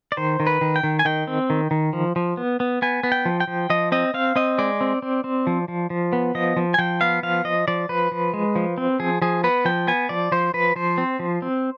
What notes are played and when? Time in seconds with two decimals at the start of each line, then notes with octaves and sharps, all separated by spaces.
0.12 D5
0.17 D#3 C5
0.40 D#3
0.47 B4
0.61 D#3
0.76 G5
0.83 D#3
0.99 G#5
1.05 D#3 G5
1.27 C4
1.50 D#3
1.71 D#3
1.93 F3
2.16 F3
2.37 B3
2.60 B3
2.82 B3 G#5
3.03 B3
3.12 G5
3.25 F3
3.40 G5
3.47 F3
3.70 F3 D#5
3.92 C4 D#5
4.14 C4 F5
4.36 C4 D#5
4.58 G#3 D5
4.81 C4
5.02 C4
5.24 C4
5.47 F3
5.68 F3
5.90 F3
6.13 B3
6.35 F3 D#5
6.57 F3
6.74 G#5
6.78 F3 G5
7.01 B3 F5
7.23 F3 F5
7.45 F3 D#5
7.68 F3 D5
7.89 F3 B4
8.11 F3
8.34 G#3
8.56 F3
8.78 C4
9.00 F3 G#4
9.22 F3 G#4
9.44 B3 B4
9.65 F3 G5
9.87 B3 G#5
10.09 F3 D5
10.32 F3 C5
10.54 F3 B4
10.76 F3 C5
10.98 C4
11.20 F3
11.42 C4